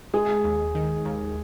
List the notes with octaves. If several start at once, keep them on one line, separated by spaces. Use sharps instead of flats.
G#3 G#4
D#2
D#3
D#2